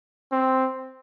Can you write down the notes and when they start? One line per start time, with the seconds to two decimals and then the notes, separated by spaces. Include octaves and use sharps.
0.32 C4